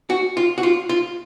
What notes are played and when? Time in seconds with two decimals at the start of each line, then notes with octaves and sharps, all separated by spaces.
0.10 F#4
0.37 F4
0.58 F#4
0.63 F4
0.89 F4